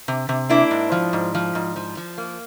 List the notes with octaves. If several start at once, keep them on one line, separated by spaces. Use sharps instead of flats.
C3
C3
A#3 D4 E4
G#2
F3
G#2
F3
G#2
F3
F3
A#3